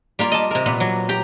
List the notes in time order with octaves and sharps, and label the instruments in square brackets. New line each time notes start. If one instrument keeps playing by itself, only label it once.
[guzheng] G3 A#3 F4
D#5 A5
C3 A#4
A#2 B3
F#3
G4 A#5